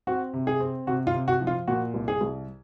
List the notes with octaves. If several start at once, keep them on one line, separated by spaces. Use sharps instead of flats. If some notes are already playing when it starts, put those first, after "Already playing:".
C4 F#4
C3
G#4
C4
C3 F#4
F4
C3
F#4
F3
F4
A#2 F#4
C2
G#4
C2